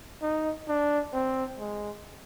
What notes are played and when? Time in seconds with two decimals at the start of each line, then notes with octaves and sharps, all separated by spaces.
0.22 D#4
0.68 D4
1.13 C4
1.59 G#3